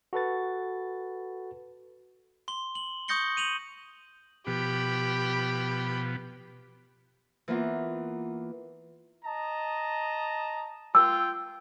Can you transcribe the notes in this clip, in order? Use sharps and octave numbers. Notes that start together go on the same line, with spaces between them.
F#4 A4 B4 A6
C6 G7
F#7
C#6 D#6 G6 A#6 C#7 G7
D#7 F7 F#7
B2 F3 B3 G4 B5
E3 A#3 B3 F4
D#5 A5 A#5
F4 G5 E6